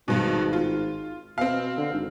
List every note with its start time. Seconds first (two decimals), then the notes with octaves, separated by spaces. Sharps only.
0.08 G#1 G2 B2
0.53 F4
1.38 B2 C4 F5
1.77 D3
1.92 G#1